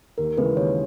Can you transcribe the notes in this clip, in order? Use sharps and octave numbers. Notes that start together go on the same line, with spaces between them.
D#2 A#4
C#3 E3 G#3 B4
D#2 C#5